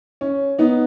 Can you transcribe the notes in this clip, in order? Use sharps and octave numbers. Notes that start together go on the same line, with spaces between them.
C#4
B3 D#4